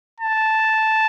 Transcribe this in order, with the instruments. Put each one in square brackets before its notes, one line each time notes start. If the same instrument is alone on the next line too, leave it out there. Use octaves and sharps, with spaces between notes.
[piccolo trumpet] A5